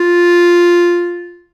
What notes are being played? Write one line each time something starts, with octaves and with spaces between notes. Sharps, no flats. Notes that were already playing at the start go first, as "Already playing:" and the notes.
Already playing: F4